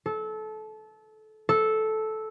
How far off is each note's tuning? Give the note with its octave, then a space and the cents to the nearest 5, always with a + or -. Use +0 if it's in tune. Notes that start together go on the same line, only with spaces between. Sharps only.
A4 -25
A4 -10